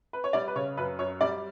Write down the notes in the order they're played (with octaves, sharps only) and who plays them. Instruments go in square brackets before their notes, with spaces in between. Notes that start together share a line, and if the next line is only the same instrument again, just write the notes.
[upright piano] B4
C#5
G3 D5
B4
C#3 C#5
F#2 B4
F#2 C#5
G3 D5